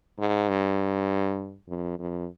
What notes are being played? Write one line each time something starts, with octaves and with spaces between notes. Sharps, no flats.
G#2
G2
F2
F2